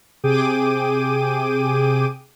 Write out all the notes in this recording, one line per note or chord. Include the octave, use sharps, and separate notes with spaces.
C3 G#4 G5 D6 D#7